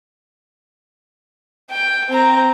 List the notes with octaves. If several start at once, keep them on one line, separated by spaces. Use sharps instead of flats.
G5
C4 A#5